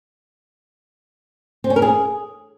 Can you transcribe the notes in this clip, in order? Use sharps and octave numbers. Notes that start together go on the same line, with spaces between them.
C4
C#4
A#4
G#4